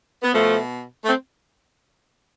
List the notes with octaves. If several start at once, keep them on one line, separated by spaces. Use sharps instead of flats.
B3
B2 F3 A3
A3 C4